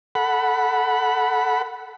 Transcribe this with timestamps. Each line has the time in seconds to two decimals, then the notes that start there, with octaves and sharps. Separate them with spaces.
0.15 A4 F#5 B5